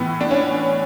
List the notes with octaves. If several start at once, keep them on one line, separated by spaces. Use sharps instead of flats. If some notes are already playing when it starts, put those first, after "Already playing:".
Already playing: A2 E3 B3
D4
C#4